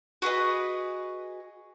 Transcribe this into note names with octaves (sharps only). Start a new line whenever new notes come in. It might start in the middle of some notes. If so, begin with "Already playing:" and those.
F#4 G#4 B4 D#5